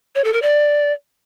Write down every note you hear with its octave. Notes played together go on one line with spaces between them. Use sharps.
C#5
A4
A#4
D5